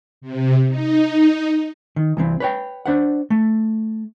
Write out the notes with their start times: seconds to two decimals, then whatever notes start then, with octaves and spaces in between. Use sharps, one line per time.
0.21 C3
0.68 D#4
1.96 D#3
2.17 C2 E3 C4
2.40 B4 C#5 G5
2.86 D4 C5 F#5
3.30 A3